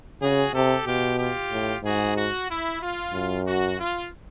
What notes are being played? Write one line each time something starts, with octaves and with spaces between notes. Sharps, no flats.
C#3 F#4 G#4
C3 G4 A4
B2 F4 G4
F4 G4
A2
G#2 F#4 G#4
F#4
E4
F4
F#2
F#4
F4